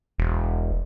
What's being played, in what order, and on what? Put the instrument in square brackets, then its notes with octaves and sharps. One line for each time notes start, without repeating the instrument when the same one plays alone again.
[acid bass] E1